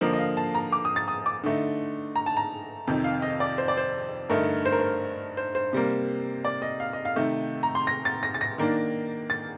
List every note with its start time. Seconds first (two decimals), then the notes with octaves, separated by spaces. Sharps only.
0.01 D3 F3 A#3 D#5
0.13 D#5
0.19 F5
0.37 A5
0.55 A#5
0.72 D6
0.85 D#6
0.96 A6
1.08 D#6
1.26 D6
1.43 D3 A3 D#4
2.16 A#5
2.26 A5
2.37 A#5
2.87 F2 C3 D#3
3.04 F5
3.22 D#5
3.40 D5
3.58 C5
3.68 D5
3.77 C5
4.30 G2 D3 A3 D#4 A#4
4.65 C5
4.72 A#4
4.80 C5
5.37 C5
5.55 C5
5.73 C3 G3 A#3
6.45 D5
6.62 D#5
6.80 F5
6.93 D#5
7.05 F5
7.16 C3 D#3 A3
7.63 A#5
7.75 C6
7.87 A#6
8.05 A6
8.23 A#6
8.34 A6
8.41 A#6
8.58 D#3 A#3 D4
9.30 A6